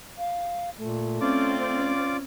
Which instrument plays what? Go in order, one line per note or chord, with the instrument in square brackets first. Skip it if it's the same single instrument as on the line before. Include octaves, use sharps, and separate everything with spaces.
[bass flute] F5
[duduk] A#2 [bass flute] A3
[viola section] C4 [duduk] C#4 [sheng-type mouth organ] F4 D5 D6
[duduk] C#4